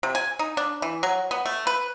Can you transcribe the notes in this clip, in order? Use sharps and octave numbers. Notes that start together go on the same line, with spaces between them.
C3
G#5
D#4
D4
E3
F#3
B3
A3
B4